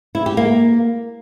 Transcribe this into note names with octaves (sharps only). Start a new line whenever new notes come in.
E4
G4
A#3